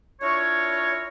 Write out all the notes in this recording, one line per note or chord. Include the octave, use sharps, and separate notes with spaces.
D4 E4 F4 A#4 C#5